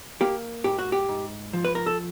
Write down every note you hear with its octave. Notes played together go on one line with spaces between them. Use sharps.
A#3 G4
G#2 G4
F#4
G4
G#2
F3
B4
A#4
A4